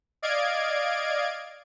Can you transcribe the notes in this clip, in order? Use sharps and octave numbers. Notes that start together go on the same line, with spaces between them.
D5 D#5 F5 G#6 D7